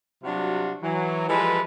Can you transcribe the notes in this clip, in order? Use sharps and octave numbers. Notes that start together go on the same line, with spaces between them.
C3 F#3 G3 D4 F4 F#4
E3 F#3
E3 F3 G3 G#3 A4 B4